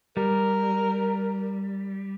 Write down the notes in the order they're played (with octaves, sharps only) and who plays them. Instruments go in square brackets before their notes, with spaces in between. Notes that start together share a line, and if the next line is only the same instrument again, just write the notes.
[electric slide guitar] G3 [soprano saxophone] A#4